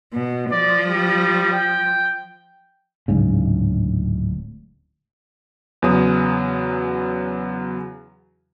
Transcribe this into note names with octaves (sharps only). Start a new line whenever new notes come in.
B2
F3 D5
G3
G5
D1 G#2 C#3
E2 C#3 F#3 D#6